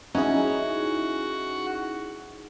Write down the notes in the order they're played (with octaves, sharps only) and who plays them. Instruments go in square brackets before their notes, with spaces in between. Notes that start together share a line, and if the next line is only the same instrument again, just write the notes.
[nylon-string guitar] C#4 [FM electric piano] D#4 E4 G#4 [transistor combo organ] F#4